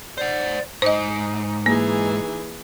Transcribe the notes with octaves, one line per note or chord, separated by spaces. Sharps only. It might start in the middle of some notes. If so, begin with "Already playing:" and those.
C5 D5 F#5
G#2 D#4 C5 D#5
E3 A#3 G#4